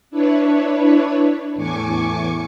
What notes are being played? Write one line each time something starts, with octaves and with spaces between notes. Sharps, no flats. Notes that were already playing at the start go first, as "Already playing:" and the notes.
D4 E4 B4 C#5
E2 A2 G#5 C#6 D6 C#7